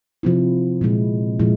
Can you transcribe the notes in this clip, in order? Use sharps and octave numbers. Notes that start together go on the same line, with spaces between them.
C3 F3 C4 E4
A#2 F3 G#3 E4
A#2 F3 G#3 E4